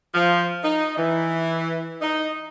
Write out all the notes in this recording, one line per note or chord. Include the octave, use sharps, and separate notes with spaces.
F3
D#4
E3
D#4